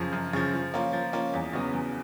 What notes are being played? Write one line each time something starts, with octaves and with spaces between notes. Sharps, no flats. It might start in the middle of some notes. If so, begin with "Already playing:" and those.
Already playing: F#2 C#3 F3
F#2
C#3 F3
F3
A#3 C#4 F4
F3
A#3 C#4 F4
E2
C#3 F#3 B3
E2